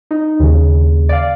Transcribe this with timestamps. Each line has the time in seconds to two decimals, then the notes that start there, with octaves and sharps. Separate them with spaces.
0.11 D#4
0.40 D#2 C#3
1.09 D5 F5